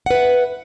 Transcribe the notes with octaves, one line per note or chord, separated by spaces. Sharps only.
B4 E5 F#5